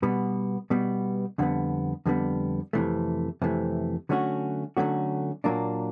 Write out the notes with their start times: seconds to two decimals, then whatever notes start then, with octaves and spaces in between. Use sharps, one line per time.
0.03 B2 G3 B3
0.70 B2 G3 B3
1.38 F2 D3 G3 B3
2.06 F2 D3 G3 B3
2.73 F2 C3 E3 A3
3.42 F2 C3 E3 A3
4.09 D3 F#3 A3 C#4 F#4
4.77 D3 F#3 A3 C#4 F#4
5.44 A#2 F#3 A#3 D4